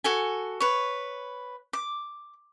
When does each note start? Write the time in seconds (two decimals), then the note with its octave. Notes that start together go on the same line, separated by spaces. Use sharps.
0.04 F#4 A4 G#5
0.60 B4 C#5
1.73 D6